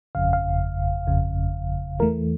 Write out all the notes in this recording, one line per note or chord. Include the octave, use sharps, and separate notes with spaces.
G1 F2 C#3 F5
F5
G1 F2 C#3
E2 E3 A3 A#4